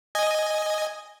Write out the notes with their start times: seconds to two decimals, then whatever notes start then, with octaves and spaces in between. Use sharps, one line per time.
0.15 D#5 G#5